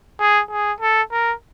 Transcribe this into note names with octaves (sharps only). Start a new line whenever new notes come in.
G#4
G#4
A4
A#4